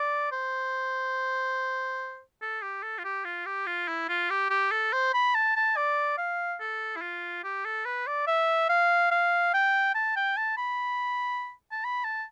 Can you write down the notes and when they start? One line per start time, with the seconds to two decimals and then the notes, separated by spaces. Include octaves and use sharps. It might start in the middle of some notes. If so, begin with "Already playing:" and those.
Already playing: D5
0.32 C5
2.42 A4
2.62 G4
2.83 A4
2.99 F4
3.05 G4
3.25 F4
3.46 G4
3.67 F4
3.88 E4
4.09 F4
4.30 G4
4.50 G4
4.71 A4
4.93 C5
5.14 B5
5.35 A5
5.56 A5
5.76 D5
6.18 F5
6.60 A4
6.96 E4
7.02 F4
7.44 G4
7.65 A4
7.86 B4
8.07 D5
8.27 E5
8.69 F5
9.11 F5
9.54 G5
9.95 A5
10.16 G5
10.37 A5
10.58 B5
11.72 A5
11.85 B5
12.04 A5